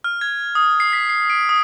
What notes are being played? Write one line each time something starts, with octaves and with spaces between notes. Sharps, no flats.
F6
G#6
D#6
C7
B6
C7
D7
D#6